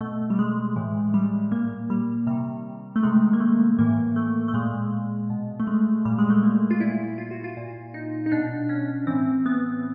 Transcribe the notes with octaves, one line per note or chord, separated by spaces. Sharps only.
B2 A3
G3
G#3
A2 E3
G3
A#2 A#3
G3
C3 D#3 G3
A3
C3 D#3 G#3
A#3
A3
A2 E3 A#3
A3
A3
A#2 G#3
B2
A3
G#3
A#2 G3
G#3
A3
A#3
F4
A#2 E4
F4
F#4
F4
A#2
D#4
D#4
B2 D4
C#4
A2 E3 C4
B3